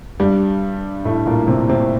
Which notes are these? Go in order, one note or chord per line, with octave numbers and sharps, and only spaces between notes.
G2 G3
A2 A3
A#2 A#3
C3 C4
C3 C4